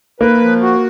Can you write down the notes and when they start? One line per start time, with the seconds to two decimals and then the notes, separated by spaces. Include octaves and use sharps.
0.20 A#3 B4
0.41 F3
0.61 F#4